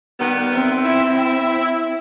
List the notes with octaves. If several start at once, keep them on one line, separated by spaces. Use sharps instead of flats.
D#3 G3 B3
C4 E5
E4